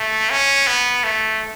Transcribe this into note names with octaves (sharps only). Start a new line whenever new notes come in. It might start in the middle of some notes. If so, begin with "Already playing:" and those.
Already playing: A3
C#4
B3
A3